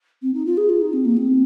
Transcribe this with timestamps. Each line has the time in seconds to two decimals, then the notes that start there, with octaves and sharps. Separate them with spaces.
0.22 C4
0.34 D#4
0.46 F4
0.57 G#4
0.69 F4
0.81 D#4
0.93 C4
1.05 A#3
1.17 C4